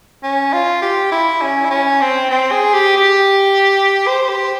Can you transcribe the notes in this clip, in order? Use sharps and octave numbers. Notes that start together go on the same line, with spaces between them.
C#4
F4
G4
E4
C#4
E4
C#4
C4
C4
G#4
G4
G4
C5
G4